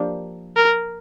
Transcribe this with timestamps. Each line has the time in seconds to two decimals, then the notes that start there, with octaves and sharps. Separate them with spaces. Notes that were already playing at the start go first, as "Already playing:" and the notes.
Already playing: F3 A#3 D4 G4
0.56 A#4